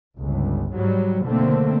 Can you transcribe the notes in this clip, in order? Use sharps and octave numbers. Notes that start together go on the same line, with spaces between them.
G1 C#2
G#2 F#3 G3
F#1 B2 D3 A3 A#3 C4